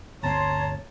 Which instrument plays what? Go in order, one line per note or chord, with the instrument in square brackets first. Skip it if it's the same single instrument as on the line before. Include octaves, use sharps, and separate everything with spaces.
[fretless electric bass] G1 D2 C4 [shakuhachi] C#5 [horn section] A5 A#5 C6